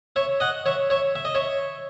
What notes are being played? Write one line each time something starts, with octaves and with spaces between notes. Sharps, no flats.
C#5 E5
D#5 F#5
C#5 E5
C#5 E5
E5
D#5
C#5 E5